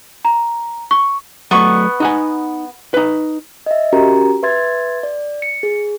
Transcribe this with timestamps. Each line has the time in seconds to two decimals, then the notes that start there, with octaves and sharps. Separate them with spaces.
0.25 A#5
0.91 C#6
1.51 F#3 A3 B3 C#6
2.00 D#4 F#5 G#5
2.94 D#4 B4
3.66 D#5 E5
3.92 C#4 F#4 G4 A#4 A#5
4.43 B4 E5 C6 G#6 A6
5.03 D5
5.42 C#7
5.63 G#4